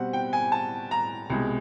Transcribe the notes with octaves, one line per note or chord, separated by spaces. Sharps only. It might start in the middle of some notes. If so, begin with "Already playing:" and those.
Already playing: B2 G3 C4 F#5
G5
G#5
A5
A#5
C2 B2 G#3